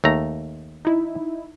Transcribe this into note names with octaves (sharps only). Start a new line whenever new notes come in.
D#2 A3 A#5
D#4 E4